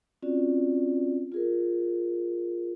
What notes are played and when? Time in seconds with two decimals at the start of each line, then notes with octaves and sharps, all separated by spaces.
0.22 C4 C#4 F4 F#4 D5
1.32 F4 G#4 A#4